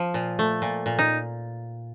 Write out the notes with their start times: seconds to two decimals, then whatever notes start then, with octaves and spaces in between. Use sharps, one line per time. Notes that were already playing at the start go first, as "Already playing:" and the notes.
Already playing: F3
0.14 A#2
0.39 A3
0.62 A#2
0.86 A#2
0.99 D#4